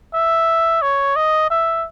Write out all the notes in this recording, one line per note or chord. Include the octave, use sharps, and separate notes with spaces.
E5
C#5
D#5
E5